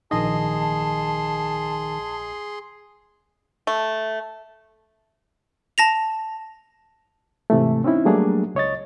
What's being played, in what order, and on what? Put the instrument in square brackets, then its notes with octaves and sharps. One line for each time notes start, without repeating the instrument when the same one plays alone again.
[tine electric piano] A#1 D#5 [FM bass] D#3 [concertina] G#4 C6 [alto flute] A5
[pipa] A3
[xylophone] A5 A#6 F7
[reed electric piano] G#2 C3 E3 A3
C4 C#4 D#4 E4
F#3 G3 A3 A#3 D4 G#4
C#2 C#5 D#5 A6